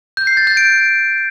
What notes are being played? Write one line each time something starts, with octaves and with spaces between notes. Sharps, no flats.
G6
C7
A6
G6
D7